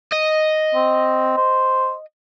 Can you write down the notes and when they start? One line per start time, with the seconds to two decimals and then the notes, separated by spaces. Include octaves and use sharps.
0.13 D#5
0.75 C4
1.37 C5